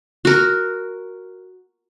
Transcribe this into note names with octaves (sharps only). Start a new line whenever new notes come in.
F#4 A#4